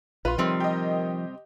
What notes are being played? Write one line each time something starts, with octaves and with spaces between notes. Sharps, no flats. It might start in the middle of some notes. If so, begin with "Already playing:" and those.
A#1 F4 B4 C6
C3 D#3 F3 G3 C4
G4 D#5